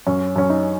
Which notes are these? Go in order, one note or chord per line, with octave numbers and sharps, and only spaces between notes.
F#2 C#4
F#2 C#4
D#4